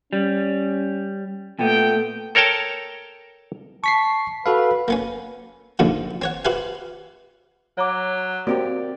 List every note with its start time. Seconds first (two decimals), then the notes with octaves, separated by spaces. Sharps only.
0.13 G3 C#4
1.59 A#2 A3 B3 G5
2.35 A4 A#4 C#5 G5 A5 A#5
3.84 A5 C#6 B6 C7
4.46 F#4 A4 B4 F5
4.88 A#3 B3 C#4
5.79 B1 F#2 A#2 D3 F3
6.22 C4 C#5 F#5
6.45 F#4 G4 B4 C5 E5 F5
7.77 F#3 C#5 A#5 D6
8.47 A#3 C4 F#4 G4 D5